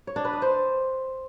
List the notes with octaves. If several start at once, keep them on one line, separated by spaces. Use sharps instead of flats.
C#5
D4
B4
D#5
C5